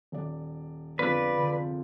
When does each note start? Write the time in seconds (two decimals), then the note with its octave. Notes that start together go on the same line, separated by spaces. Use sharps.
0.12 D#1 D5
0.99 G1 F2 F4 G#4 B4 D5 B5
1.37 D3 C4